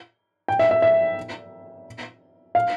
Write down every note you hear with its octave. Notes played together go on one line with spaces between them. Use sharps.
G5
E5
E5
E5
F5